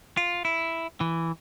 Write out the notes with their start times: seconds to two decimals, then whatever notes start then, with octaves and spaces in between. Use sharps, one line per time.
0.17 F4
0.45 E4
1.01 E3